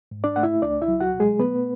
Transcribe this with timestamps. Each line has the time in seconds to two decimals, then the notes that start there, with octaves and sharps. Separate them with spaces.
0.11 G#2
0.24 D4 D5
0.36 A3 F#5
0.43 E4 E5
0.62 C#2 D4 D5
0.82 E4 E5
0.88 F#3
1.00 F#4 F#5
1.14 B2
1.20 G#3 G#4
1.39 A3 B3 B4